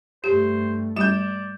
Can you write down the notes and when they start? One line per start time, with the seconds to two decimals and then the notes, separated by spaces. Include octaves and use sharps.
0.24 G2 A3 G4 C5
0.96 G3 D5 G6 E7